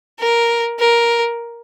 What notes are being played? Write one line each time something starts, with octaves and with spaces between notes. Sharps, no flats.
A#4
A#4